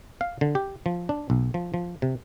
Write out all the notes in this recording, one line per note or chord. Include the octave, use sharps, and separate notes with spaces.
F5
D3
G4
F3
D4
B1
F3
F3
C3